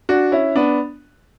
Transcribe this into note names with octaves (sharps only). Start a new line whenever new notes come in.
D4 F#4
C#4 E4
B3 D4